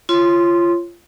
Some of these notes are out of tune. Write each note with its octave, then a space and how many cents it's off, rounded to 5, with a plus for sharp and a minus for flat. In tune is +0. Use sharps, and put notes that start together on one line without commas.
F4 -25 C#5 -15 C6 +0